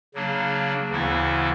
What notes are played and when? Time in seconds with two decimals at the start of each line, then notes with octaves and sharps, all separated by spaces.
0.14 C#3 F#3 A#3 D4
0.89 D2 C#3 E3 B3 E4